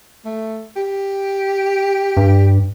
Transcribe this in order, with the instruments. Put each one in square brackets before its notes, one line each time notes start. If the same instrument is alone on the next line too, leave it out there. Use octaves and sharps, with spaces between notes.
[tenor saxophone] A3
G4
[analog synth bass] G2